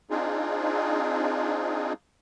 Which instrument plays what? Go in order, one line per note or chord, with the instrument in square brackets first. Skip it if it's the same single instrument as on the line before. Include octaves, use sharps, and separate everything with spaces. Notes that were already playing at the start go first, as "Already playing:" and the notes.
[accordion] C4 D4 D#4 F4 G#4